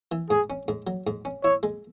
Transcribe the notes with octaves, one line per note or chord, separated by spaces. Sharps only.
E3
G#2 G#4
C#4
G#2
F#3
G#2
C#4
E4 C#5
G#3